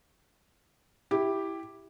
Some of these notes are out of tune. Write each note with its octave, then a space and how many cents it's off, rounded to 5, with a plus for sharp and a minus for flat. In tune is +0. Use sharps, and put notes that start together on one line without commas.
E4 +0 G4 +0